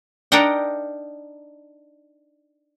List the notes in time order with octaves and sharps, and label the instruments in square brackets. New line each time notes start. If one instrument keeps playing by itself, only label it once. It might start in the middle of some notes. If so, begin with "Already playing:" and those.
[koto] D4 D#4 A#4 D#5 F#5 G5